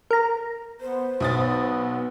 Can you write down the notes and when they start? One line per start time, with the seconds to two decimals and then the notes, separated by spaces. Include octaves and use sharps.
0.11 A#4 A#5
0.81 B3 C5
1.20 B1 B3 D#6 A6